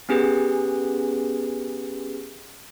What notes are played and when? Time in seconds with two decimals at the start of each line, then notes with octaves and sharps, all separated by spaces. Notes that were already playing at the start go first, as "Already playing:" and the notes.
0.09 B3 C#4 G4 G#4 B4